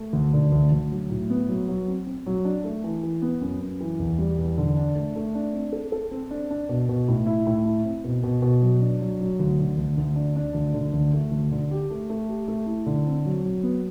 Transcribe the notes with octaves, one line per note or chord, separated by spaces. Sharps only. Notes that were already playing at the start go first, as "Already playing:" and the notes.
Already playing: A3
D2
D3
D2
D2
F#3
A2
B3
F#3
F#3
C4
C4
F#3
D4
A3
E3
E3
B3
F#2
F#2
E3
E2
G3
E2
D3
D4
A3
A3
D4
C4
A4
A4
C4
D4
D4
B2
B2
A2
E4
A2
E4
C4
B2
B2
B2
F#3
D4
F#3
F#3
D2
D3
D2
D2
D4
D4
D2
D3
D2
A3
D2
D3
G4
A3
A3
G4
A3
E4
D3
C4
F#3
F#3
B3